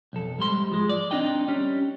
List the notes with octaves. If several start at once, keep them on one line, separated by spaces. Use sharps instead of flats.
B1 F2 A4
G#2 G3 C6
F3 G#3
D5
C4 D4 D#4 D#5 G5
G3 C#4